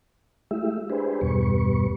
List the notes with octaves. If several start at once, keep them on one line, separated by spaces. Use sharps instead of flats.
G#3 A3 E4 F4 G4 E5
D4 G4 G#4 B4 C5
E2 G2 B2 G3 B4 C#6